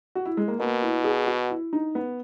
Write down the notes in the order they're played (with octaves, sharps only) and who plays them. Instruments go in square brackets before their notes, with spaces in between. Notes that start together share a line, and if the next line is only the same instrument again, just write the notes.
[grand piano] F#4
E4
G#3
A#3
[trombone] B2 [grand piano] A#3
[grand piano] E4
G#4
F#4
E4
D#4
B3